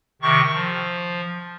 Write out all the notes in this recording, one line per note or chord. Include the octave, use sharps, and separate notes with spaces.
C3 D#3 C#6
F3